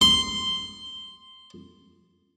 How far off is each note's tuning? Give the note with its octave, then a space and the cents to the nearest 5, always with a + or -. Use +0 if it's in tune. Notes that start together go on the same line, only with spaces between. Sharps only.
C6 -5